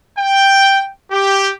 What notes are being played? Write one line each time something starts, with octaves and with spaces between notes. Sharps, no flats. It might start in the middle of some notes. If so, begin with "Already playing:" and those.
G5
G4